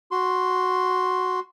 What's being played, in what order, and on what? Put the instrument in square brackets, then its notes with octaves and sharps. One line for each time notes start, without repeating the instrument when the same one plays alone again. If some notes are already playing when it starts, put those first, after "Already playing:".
[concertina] F#4 C6